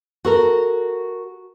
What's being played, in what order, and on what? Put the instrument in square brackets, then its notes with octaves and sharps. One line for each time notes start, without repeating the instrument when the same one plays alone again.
[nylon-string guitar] F#4 A4 A#4